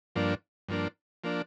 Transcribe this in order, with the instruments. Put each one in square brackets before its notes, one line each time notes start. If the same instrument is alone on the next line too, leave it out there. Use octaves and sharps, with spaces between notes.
[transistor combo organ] G2 F3 A#3 D4
G2 F3 A#3 D4
F3 A#3 D4